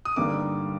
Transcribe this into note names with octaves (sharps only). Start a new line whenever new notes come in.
D#6
G2 D3 G3 A#3 D#4 D6